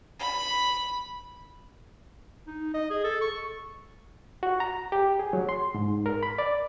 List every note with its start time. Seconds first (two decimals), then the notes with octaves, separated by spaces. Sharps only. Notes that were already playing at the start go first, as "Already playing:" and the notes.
0.19 B5
2.47 D#4
2.74 D#5
2.90 G#4
3.04 A4
3.21 C#6
4.43 F#4
4.60 A#5
4.92 G4
5.19 G#4
5.33 F#3
5.49 C6
5.74 G#2
6.06 A#4
6.23 B5
6.38 D5